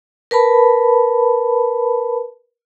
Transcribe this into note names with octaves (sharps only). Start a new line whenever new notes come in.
A#4 B4 A5 B5